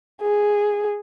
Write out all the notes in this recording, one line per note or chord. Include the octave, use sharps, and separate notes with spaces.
G#4